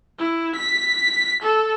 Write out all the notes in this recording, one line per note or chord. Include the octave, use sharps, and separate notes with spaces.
E4
B6
A4